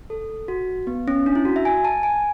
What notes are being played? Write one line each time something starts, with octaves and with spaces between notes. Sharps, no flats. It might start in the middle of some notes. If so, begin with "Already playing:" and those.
A4
F#4
B3
C#4
D4
E4
F#4
E5
G#5
A5
G#5